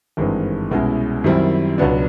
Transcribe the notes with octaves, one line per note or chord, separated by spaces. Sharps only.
G#1 G2 E3 G#3 C4
C2 B2 G#3 C#4 E4
F#2 D#3 G3 C4 E4
C#2 B2 F#3 B3 D4